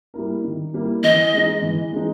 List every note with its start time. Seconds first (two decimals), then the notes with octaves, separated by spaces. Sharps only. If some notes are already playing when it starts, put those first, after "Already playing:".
0.14 G3 A#3 E4 A#4
0.44 D#3
0.74 G3 A#3 E4 A#4
1.03 E3 D#5
1.34 G#3 D#4
1.62 E3
1.93 G#3 D#4